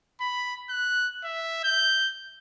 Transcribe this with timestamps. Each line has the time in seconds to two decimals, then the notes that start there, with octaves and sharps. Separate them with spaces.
0.20 B5
0.69 F#6
1.24 E5
1.64 G6